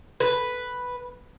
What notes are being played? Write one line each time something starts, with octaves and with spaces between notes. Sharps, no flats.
B4